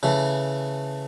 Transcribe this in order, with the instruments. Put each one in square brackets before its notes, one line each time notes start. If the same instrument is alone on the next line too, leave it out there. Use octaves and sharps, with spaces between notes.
[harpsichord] C#3 E3 A3